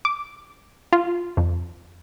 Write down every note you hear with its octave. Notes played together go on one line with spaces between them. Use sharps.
D6
F4
F2